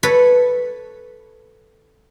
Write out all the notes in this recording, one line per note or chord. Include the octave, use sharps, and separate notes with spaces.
A4 B4 C#5 B5